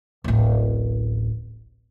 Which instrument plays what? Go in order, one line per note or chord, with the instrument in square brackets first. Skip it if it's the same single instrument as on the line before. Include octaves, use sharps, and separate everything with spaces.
[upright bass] D1 A1